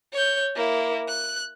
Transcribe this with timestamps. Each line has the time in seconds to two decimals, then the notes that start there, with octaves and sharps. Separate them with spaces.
0.13 C#5 G6
0.55 A#3 E4
1.08 F#6